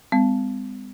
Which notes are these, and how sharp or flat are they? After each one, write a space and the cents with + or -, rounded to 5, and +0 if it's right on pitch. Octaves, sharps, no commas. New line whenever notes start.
G#3 -45 C4 -45